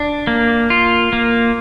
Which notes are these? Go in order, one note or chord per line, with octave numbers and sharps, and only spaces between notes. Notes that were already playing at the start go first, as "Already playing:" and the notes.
Already playing: D4
A#3
F4
A#3